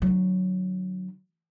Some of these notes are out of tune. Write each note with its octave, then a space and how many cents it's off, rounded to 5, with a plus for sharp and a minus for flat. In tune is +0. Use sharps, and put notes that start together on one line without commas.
D3 +35 F#3 +0